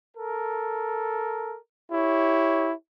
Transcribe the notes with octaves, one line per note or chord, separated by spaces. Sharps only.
A4 A#4
E4 G4 C#5